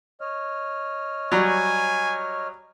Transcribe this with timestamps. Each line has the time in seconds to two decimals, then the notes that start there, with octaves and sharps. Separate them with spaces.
0.21 C#5 D#5 F6
1.32 F#3 G3 G#5